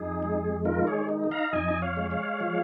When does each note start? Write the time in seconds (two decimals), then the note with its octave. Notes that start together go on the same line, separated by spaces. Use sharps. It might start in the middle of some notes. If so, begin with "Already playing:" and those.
Already playing: F2 D#4 G#4
0.23 G#3
0.65 D#3 F4 A#4
0.87 G#4 C#5
1.09 D#4
1.31 F5 A#5
1.53 F2 D#5 G#5
1.82 C#5 F5
1.97 G#3
2.10 C#5 F5
2.40 F3